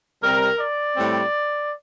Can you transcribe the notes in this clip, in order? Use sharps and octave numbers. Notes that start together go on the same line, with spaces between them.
C3 G3 C4 A#4
D5
A2 G3 C4